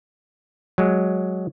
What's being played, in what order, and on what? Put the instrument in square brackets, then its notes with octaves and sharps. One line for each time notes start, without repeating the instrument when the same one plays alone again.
[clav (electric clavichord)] F#3 G#3